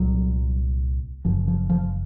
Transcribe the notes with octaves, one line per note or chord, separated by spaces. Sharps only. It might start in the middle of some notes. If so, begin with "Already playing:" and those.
Already playing: C2 A#2 F#3
F#1 F#2 C#3 F3
F3
F3